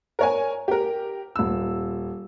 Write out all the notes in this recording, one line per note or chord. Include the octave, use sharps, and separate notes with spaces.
A#4 C#5 G#5
G4 A#4
D#1 E6